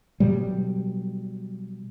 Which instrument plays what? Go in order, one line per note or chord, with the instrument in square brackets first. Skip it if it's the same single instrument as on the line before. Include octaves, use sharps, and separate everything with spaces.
[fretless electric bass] B2 F#3 G3